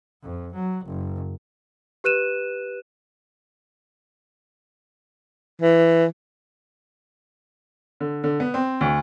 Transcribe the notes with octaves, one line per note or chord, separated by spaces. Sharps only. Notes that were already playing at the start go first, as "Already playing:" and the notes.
F2
F#3
F#1
G4 B4 F#6 D#7 E7
E3
D3
D3
B3
C4
D2